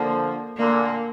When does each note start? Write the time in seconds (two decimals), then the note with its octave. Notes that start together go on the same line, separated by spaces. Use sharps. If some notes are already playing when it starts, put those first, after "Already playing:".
Already playing: D3 F3 A#3
0.57 A#2 D3 A#3